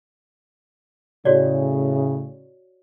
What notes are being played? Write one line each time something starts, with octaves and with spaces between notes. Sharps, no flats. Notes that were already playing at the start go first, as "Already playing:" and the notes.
A2 C#3 F#4 C#5 D5